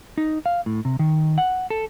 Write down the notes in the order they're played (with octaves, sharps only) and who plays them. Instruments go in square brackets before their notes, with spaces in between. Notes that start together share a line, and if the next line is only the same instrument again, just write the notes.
[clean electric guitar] D#4
F5
A2
C3
D#3
F#5
A4